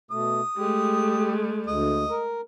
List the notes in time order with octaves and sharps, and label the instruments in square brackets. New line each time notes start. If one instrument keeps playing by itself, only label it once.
[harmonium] B2 A3 [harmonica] D#6
[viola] G#3 A3 [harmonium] G4
[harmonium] D2 [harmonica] D#5
[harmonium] A#4